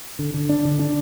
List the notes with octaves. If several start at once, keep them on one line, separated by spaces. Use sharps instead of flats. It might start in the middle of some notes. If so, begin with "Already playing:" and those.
D3
D3
D4
D3
D4